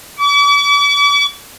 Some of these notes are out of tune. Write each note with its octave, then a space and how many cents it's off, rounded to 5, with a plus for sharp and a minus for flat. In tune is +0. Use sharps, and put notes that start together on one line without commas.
D6 -45